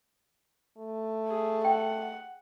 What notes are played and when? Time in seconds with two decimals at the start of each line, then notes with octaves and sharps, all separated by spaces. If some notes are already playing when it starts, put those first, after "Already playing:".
0.78 A3
1.29 G#4
1.65 F#5 G5